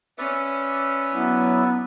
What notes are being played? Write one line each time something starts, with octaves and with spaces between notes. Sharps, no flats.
C#4 B4 D5 E5
F#3 B3 E4